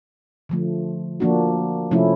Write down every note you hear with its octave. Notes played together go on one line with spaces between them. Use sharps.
D3 F3 A3
F3 A#3 D4 F#4
C3 F3 A3 C#4 E4